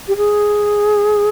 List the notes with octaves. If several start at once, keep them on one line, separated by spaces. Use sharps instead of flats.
G4
G#4